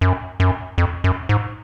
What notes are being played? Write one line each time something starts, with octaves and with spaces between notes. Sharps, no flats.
F#2
F#2
F2
F#2
G#2